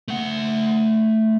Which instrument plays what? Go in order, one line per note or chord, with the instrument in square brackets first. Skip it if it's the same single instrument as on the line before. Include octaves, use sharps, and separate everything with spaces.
[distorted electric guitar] A3 F#5